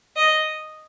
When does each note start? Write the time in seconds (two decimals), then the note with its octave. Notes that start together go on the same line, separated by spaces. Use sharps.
0.16 D#5